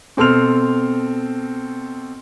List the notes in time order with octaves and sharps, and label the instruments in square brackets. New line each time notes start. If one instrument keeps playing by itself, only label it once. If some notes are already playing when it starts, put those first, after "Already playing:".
[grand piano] B2 C4 A4 C6 F6 F7